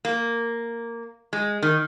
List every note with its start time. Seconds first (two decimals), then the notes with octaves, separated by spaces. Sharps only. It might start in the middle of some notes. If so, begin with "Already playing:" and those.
0.05 A#3
1.33 G#3
1.62 D#3